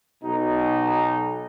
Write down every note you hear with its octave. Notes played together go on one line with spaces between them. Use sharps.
B1 B2 D#4